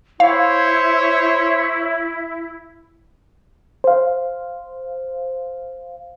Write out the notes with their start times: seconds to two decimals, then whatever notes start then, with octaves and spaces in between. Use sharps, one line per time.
0.20 E4 C5 C#5 F5
3.84 C5 F5